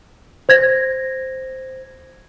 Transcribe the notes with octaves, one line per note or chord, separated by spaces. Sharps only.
C5 G#6 A#6